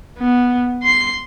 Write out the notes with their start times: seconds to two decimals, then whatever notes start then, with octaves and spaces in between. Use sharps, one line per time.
0.19 B3
0.83 C6 C7